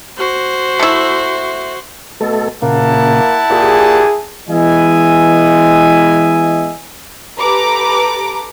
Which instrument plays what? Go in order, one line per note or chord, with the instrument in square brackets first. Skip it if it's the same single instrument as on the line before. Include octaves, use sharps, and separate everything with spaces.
[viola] F#4 C5
[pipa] A3 E4
[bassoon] B2 [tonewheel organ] A3 A4
[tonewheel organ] A#2 C#3 [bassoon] A#3 [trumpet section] E4 F#5 A5
[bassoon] A#2 [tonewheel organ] G4 [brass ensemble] G#4
[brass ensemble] E3 G#3 B3 D#5 E5 G#5
[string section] G4 A4 B4 A#5 D6